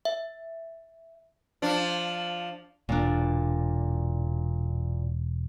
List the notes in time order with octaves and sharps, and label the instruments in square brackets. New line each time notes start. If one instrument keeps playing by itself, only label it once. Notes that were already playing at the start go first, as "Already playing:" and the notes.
[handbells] E5
[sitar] F3 D4
[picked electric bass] E1 [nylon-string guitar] A#2 A#3 D4